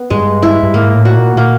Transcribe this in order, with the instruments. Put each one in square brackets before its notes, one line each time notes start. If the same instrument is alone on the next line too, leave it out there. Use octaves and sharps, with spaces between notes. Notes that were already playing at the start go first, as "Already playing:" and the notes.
Already playing: [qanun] B3
[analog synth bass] G2 [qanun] G#3
[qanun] E4
[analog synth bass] G2
[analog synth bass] G#2 [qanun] A#3
[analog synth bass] A2
[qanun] F#4
[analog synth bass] A#2
[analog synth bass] A#2 [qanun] A#3